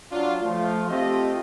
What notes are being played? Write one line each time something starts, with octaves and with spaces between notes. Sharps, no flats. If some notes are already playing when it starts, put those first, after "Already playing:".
F#3 D4 F4
F3 A3 F4
A3 C4 F4 G4 D#5